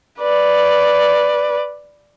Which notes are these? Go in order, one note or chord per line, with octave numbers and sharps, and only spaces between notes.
B4 D5